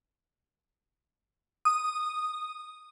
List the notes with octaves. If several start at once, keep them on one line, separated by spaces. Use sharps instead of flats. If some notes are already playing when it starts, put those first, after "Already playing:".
D#6